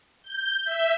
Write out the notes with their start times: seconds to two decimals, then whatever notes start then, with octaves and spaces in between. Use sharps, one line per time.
0.23 G6
0.65 E5